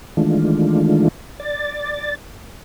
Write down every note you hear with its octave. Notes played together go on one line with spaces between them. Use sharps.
D#3 E3 G#3 A3 D4 F4
D5 A6